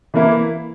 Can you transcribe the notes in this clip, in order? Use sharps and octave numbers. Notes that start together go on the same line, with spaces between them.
E3 A#3 E4